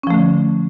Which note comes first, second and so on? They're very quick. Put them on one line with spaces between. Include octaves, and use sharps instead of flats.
C#4 F3 A3 D3